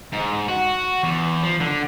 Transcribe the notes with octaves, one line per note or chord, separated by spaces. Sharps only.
G#2
F#4
E2
F3
D3